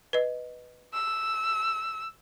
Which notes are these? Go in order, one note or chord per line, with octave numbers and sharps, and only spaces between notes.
B4 D#5
E6